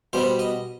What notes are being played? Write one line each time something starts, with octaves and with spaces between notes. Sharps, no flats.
B2 G3 B3 C5
D#5